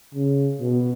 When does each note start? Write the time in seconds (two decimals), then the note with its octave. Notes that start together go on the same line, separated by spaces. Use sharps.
0.14 C#3
0.60 B2